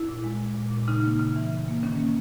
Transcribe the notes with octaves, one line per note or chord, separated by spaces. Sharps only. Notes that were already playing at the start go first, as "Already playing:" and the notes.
Already playing: E4
A#2
G#3
G#3
A#2
A#2
C#3 D#4
A#3
C#3
E3
C#3
A#3
D#3 C#4
A#3